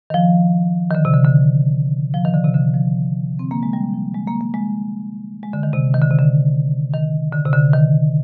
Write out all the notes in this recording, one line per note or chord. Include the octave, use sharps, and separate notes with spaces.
D#3
F3
D#3
D3
C3
D3
D3
F3
D#3
D3
C3
D3
F3
C4
A#3
G#3
G3
F3
G#3
A#3
A#3
G#3
G#3
D3
D#3
C3
D#3
D3
C3
D3
D#3
D3
C3
D3
D#3